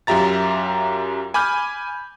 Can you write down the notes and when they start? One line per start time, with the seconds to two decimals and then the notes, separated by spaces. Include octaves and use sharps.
0.07 F#2 F4 G4 E5 A#5 A6
1.34 G#5 B5 D6 F6 G6